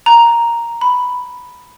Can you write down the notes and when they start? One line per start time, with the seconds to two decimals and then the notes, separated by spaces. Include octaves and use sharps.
0.06 A#5
0.81 B5